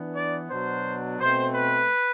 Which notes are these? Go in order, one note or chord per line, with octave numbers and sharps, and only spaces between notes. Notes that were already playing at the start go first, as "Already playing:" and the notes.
Already playing: E3 B3 D4
D5
B2 F#3 B3 D4 C5
B2 A3 C4 C5
B4